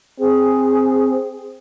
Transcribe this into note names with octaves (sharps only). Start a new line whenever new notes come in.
C4 G#4